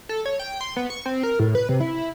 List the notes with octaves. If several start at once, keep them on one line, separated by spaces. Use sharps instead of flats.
A4
C#5
G5
C6
B3
C#6
C4
A#4
A2
B4
C3
E4